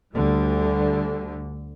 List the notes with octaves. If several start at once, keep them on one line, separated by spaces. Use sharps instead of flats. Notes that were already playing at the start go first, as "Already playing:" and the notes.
D2 D3 G3